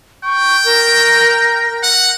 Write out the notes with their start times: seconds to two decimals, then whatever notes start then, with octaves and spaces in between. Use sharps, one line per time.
0.24 G5 C#6
0.65 A#4
1.83 F#5